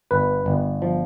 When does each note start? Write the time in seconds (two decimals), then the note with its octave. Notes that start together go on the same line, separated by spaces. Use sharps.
0.11 G1 B4
0.46 G1
0.82 F3